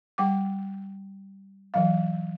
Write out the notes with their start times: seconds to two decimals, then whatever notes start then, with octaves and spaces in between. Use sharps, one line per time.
0.18 G3 G5 D6
1.74 E3 F#3 F5